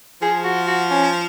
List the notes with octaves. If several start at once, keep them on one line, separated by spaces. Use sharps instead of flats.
F3 G#4
F#4
F#4
C#4